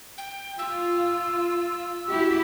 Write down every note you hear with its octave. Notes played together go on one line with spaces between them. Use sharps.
G5
F4 E6
E4 F#4 G4